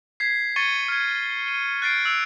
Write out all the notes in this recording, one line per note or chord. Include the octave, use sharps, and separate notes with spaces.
G#6 B6 C7
C#6 G#6 A6 C#7 D#7 G7
F6 G#6
D#7
F#6 G#6 A6 C7 D7
E6 F#6 D7 F7